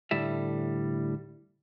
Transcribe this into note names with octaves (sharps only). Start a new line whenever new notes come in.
D2 A2 G3 E5